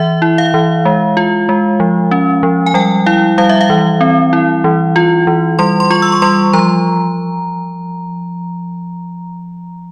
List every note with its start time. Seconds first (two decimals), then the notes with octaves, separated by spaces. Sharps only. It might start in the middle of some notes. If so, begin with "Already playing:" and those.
Already playing: E3 E5
0.22 E4
0.38 F5
0.54 E3
0.85 G#3
1.17 F4
1.49 G#3
1.80 F3
2.11 C#4
2.43 F3
2.66 G#5
2.74 G3 G5
3.06 E4 F5
3.38 G3 F5
3.49 E5
3.61 F5
3.70 E3
4.01 C4
4.33 E4
4.64 E3
4.96 F4
5.27 E3
5.59 G3 C6
5.80 C6
5.90 F4 C#6
6.02 E6
6.12 C#6
6.22 G3 C6
6.53 F3 A#5